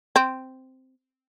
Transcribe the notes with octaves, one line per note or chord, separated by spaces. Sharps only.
C4